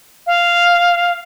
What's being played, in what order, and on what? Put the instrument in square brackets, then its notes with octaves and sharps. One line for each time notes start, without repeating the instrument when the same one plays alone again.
[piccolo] F5